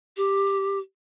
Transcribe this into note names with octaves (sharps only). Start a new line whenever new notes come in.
G4